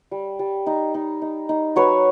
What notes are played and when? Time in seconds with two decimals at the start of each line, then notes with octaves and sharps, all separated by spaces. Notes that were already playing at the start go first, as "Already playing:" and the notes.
0.11 G3
0.39 G3
0.66 D#4
0.94 D#4
1.22 D#4
1.49 D#4
1.76 F#3 B4 C#5